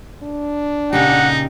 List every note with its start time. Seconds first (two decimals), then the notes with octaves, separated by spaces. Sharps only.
0.23 D4
0.93 A#2 C#3 D#4 G4 F#5